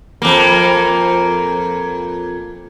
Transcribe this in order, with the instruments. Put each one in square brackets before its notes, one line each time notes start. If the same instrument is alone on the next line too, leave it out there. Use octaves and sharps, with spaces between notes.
[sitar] F2 A#3